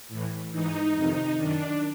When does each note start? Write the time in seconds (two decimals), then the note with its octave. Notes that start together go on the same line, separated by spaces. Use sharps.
0.08 A2 E3
0.52 G#2 E3 D#4
0.94 F2 C3 D#3 D#4
1.37 F#2 D#3 D4